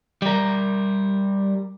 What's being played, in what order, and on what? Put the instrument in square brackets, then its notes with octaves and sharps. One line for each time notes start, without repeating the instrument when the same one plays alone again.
[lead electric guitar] G3 A#4